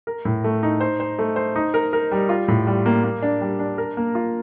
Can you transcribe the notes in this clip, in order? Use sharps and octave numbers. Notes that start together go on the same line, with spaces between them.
A#4
A2
A3
D#4
C5
C5
A3
C5
D#4
A#4
A#4
G3
F4
A2
G3
A#3
A#3
D4
G3
D4
A#4
A#3
F4